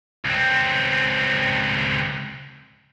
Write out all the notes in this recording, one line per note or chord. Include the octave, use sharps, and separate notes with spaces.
C#2 C4